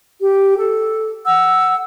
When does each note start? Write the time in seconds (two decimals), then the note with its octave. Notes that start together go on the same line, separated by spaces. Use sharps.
0.19 G4
0.58 A4
1.26 F#5 E6